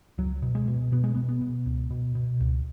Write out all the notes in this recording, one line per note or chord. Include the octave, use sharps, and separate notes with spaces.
C#2 F#3
B2
G#3
B2
B2 B3
G#3
B3
B2
B3
B2
C#2
B2
B2
C#2